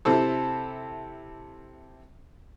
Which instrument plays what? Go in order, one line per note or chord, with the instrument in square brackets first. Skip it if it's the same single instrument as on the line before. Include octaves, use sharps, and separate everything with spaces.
[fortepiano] C3 C4 E4 A4